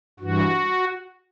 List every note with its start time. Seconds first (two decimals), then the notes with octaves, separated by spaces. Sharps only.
0.20 G2 E3 F#4